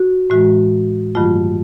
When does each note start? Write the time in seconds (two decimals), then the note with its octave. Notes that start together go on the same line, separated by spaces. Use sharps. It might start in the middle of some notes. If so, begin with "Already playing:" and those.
Already playing: F#4
0.30 A2 E3 G#3 F#4
1.15 G2 D#3 F#3 A3 F4